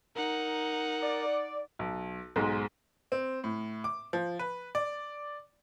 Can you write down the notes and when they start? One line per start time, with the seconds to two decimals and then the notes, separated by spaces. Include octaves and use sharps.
0.16 D#4 A#4 F#5
1.02 D5
1.79 B1
2.36 B1 G#2 G#3 C6
3.12 C4
3.44 A2
3.84 D6
4.13 F3
4.39 B4
4.75 D5